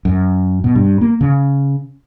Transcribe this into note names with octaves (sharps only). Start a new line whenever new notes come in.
F#2
B2
G2
A#3
C#3